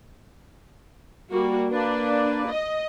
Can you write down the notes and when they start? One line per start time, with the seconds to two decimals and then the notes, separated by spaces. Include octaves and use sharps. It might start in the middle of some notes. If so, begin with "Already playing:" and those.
1.31 G3 A#3 F#4
1.72 A#3 D4 B4 D5
2.49 D#5